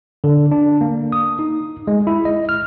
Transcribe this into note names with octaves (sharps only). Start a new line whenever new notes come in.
D3
D4
A#3
D#6
D#4
G#3
E4
D#5
F6